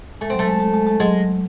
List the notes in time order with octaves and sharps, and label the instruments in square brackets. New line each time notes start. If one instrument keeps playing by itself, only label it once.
[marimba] G#3 [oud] A3
[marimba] F#3 [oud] C4
[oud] A3
[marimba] G#3
G#3
G#3
G#3
[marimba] F#3 [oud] G#3